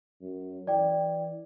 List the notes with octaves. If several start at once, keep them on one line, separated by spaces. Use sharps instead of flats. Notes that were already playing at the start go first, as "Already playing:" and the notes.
F#2
E3 D5 G5